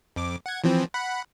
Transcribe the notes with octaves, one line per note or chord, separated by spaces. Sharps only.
F2 D6
F#5 G#6
E3 F3 C4
F#5 B5